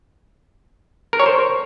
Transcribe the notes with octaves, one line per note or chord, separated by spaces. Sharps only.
A#4
C#5
C5